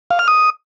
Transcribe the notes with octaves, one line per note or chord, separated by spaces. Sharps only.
F5
F6
D#6